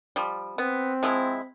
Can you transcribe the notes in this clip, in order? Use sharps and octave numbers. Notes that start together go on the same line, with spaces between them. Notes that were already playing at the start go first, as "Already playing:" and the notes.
F3 G3
B3 C4
F3 G#3 E4